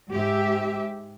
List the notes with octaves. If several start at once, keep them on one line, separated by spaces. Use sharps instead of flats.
G#2 G4 E5